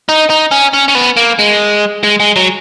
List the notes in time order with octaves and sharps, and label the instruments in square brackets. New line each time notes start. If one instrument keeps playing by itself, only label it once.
[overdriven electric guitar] D#4
D#4
C#4
C#4
C#4
B3
A#3
G#3
G#3
G#3
F#3